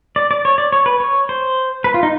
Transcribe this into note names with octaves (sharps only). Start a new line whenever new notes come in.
D5
D5
C#5
D5
C#5
B4
C#5
C5
B4
F4
D#4